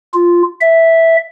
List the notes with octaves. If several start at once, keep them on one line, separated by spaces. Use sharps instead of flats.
F4
E5